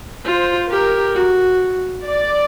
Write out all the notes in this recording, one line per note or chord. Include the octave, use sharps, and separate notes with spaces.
F4 C5
G4 A#4
F#4
D5